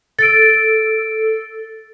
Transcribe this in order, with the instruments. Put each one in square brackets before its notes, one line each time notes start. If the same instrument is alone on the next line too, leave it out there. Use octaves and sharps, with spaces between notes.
[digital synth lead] A4 [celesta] A6 D7